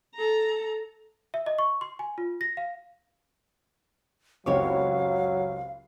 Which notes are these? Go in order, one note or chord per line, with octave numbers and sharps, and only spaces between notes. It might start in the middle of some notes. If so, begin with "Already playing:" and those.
A4 A#5
E5
D#5
C#6
C6
G#5
F4
A#6
F5
F#1 C#2 F#3 C4 G4 C#5 F5 C#6